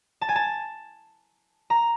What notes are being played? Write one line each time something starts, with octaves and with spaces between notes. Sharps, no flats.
A5
G#5
A5
A#5